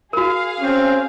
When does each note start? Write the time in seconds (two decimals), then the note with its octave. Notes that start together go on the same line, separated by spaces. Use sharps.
0.13 F#4 G#4 A#4 F5
0.60 C4 C#4